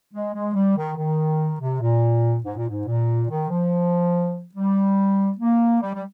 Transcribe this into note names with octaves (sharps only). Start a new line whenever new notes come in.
G#3
G#3
G3
D#3
D#3
C3
A#2
G#2
A#2
G#2
A#2
D#3
F3
G3
A#3
G3
G3